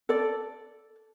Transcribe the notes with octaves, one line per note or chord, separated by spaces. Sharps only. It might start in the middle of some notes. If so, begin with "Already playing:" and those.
A4 D5